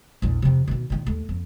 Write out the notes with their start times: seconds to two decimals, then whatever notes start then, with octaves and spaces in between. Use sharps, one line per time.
0.22 A#1 E2
0.42 F2 C3
0.68 B2 D#3
0.90 A#2 D#3
1.06 D#2 A3
1.29 F2